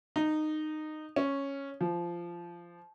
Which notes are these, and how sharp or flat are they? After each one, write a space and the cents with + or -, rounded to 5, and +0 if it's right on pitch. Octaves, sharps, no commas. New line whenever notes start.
D#4 -15
C#4 -5
F3 -15